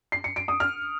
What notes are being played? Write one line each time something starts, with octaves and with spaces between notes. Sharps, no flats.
C7
C#7
D7
D#6
F6